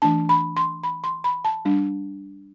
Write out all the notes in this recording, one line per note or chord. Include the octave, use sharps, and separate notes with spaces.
E3 A3 D4 A5
B5
C6
B5
C6
B5
A5
G3 D4